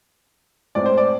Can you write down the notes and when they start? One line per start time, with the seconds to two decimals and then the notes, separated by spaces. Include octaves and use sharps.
0.75 A2 G#3 C4 D5
0.86 C5
0.98 D5